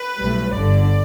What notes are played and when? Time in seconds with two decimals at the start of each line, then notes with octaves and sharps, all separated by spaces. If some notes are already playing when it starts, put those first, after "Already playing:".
Already playing: B4
0.17 B1 A2 G3
0.54 G1 G2 D3 D5